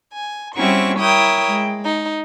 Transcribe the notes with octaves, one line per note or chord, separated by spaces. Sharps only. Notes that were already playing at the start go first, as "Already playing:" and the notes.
G#5
G3 C4 C#4 E4 F#4 C#6
E4 A#4 C#5 G5 D#6
G#3
D#4